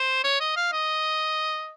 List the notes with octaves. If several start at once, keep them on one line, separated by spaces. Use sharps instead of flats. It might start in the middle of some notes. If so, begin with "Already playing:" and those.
Already playing: C5
C#5
D#5
F5
D#5